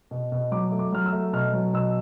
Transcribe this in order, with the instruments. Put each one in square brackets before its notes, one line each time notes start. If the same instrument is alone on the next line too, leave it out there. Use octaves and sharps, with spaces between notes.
[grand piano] B2
B2
F#3 D6
A3
D6
F#3 F6
E6
A3
B2 F6
F#3
B2 E6